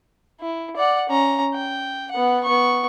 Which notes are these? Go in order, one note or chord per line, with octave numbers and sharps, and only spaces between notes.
E4
D5 F#5
C#4 A#5
G5
B3 F#5
B3 C#6